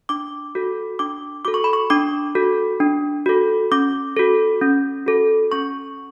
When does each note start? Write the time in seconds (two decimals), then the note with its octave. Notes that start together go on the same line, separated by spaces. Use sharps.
0.09 D4 D6
0.55 F#4 A4
0.99 D4 D6
1.45 F#4 A4 D6
1.54 C#6
1.64 B5
1.73 C#6
1.90 D4 D6
2.35 F#4 A4
2.80 D4
3.26 F#4 A4
3.72 C#4 D6
4.17 F#4 A4
4.61 C#4
5.06 F#4 A4
5.52 C#4 C#6